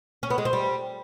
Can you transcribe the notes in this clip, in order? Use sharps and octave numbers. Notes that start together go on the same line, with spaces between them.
C#4
B3
G#3
C4
G3